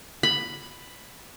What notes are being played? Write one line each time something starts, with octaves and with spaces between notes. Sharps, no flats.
B5